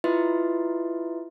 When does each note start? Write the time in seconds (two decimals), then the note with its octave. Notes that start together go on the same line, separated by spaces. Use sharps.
0.04 E4 F4 B4 D#5 E5 C6